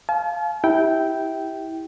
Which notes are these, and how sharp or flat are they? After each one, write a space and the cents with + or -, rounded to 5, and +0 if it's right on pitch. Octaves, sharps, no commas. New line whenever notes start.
F5 +0 A5 -45
E4 -20 G4 -5 G5 -10